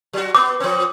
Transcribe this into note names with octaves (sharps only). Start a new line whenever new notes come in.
F#3 F#4
B3 D6
F3 C4